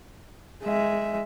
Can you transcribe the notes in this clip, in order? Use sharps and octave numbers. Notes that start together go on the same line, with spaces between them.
G#3 E5